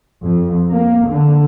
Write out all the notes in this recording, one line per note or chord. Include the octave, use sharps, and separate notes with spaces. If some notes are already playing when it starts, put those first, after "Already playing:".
F2
A#3
D3